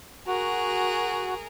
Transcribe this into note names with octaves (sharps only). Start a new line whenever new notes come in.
F#4 G#4 A#4